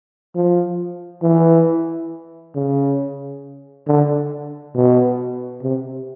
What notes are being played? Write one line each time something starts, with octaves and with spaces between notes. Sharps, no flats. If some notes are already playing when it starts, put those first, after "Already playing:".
F3
E3
C#3
D3
B2
C3